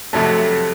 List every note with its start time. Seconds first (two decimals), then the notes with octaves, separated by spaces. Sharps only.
0.13 F2 C3 F#3 A3 A4